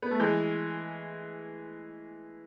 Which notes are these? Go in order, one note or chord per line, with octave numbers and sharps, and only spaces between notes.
B3
A3
E3 G#3